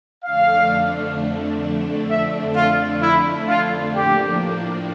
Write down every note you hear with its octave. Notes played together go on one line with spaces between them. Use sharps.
F2 D3 A3 D4 F5
E5
F4
E4
F4
A2 F3 A#3 D4 G4